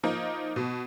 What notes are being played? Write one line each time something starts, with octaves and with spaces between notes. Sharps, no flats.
F3 A#3 D#4
B2